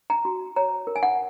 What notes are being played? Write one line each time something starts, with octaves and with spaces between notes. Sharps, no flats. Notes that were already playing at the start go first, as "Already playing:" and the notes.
A#5
F#4
C#5 A#5
A#4
G#5
F#5